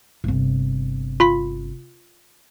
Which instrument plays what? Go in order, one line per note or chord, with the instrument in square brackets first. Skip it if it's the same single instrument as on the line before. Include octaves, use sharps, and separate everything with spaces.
[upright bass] G1 C3
[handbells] F4 B5 B6